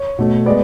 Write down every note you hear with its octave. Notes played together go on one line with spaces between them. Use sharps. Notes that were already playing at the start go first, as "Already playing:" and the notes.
Already playing: C#5
B2 A3
G#3 B3 D5